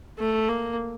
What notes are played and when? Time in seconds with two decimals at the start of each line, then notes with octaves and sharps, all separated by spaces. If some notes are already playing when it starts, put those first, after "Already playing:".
0.19 A3
0.49 A#3